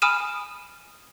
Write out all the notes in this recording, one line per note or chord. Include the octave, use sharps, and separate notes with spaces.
G#5 B5 D#6 F6 D#7 E7